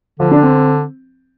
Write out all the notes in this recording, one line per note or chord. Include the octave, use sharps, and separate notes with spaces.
D3 F3
D4
C4